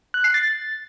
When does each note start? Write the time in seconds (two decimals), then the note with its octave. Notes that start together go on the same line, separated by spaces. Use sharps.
0.14 F#6
0.24 C7
0.34 A6